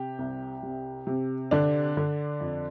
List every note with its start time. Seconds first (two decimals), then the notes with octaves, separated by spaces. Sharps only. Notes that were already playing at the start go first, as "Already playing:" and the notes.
Already playing: C3 G4
0.19 C2
0.63 C3
1.07 C3
1.51 D3 D4
1.97 D3
2.40 F2